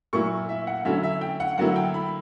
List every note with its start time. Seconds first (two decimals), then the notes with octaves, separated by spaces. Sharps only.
0.13 A#2 F#3 A#3 E4 C#6
0.49 E5
0.67 F#5
0.85 D3 F#3 C#4 E4 E5
1.03 E5
1.21 G5
1.40 F#5
1.58 D3 F#3 A#3 E4 F#5
1.76 G5
1.94 B5